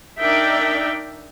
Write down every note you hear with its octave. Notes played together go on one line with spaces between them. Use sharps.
D4 D#4 A#4 D5 E5 G5